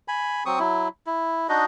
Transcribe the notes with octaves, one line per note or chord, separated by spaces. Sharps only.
G#5 B5
F#3 C4 C#6 D#6
F#3 E4
E4
D4 D#4 F#4 D#5